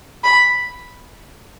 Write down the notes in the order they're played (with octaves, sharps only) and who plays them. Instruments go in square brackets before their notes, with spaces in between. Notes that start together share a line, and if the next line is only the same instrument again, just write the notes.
[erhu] B5